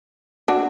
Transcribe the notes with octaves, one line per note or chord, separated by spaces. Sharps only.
D4 F#4